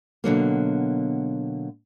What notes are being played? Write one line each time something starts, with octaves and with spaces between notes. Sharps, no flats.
B2 D3 F#3 A#3